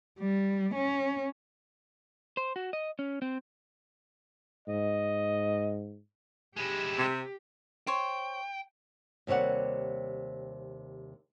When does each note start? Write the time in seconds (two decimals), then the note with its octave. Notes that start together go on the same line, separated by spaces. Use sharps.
0.19 G3
0.74 C#4
2.37 C5
2.56 F#4
2.73 D#5
2.99 C#4
3.22 C4
4.68 G#2 D#5
6.56 G#3 E4 G4
6.98 C3 C4
7.87 C5 C#5 G5
9.27 D#2 C3 G3 C#5 F#5